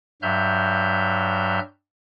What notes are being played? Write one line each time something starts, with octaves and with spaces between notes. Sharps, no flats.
G2 F#3 E5 F6 G6